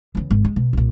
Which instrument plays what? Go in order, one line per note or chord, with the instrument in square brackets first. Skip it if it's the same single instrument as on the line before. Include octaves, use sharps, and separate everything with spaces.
[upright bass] E2 C#3
G#1
G#3
B2
C2 A#2